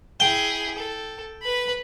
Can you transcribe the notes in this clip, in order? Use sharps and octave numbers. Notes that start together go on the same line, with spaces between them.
E4 G#4 G5
A4
B4 B5